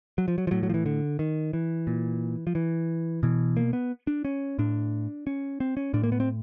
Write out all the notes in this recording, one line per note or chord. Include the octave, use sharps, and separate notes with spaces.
F#3
F3
F#3
F3
A2 F#3
F#3
F3
E3
D3
D#3
E3
A#2
F3
E3
B2 E3
A#3
B3
D4
C#4
A2 D4
C#4
C4
C#4
A2 D4
A#3
B3
C4